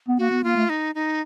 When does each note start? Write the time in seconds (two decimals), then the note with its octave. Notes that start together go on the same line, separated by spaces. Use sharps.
0.08 B3
0.18 A#3 F#4
0.31 B3
0.43 A#3 F4
0.56 A3
0.69 D#4
0.95 D#4